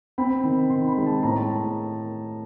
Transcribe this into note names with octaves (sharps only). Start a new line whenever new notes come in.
C4 B5
D#3
D#3 C6
B5
G#3
A5
A2 A#5
A5